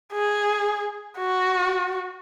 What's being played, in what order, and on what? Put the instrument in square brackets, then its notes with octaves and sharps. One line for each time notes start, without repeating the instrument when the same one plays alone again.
[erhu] G#4
F#4